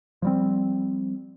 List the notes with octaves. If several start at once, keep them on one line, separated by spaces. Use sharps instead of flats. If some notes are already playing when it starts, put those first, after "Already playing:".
F3 G3 C4